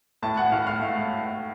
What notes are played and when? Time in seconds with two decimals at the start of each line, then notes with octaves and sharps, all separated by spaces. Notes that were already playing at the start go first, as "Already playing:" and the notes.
0.23 A2 A5
0.37 F#5
0.52 A2 F5
0.67 F5
0.81 A3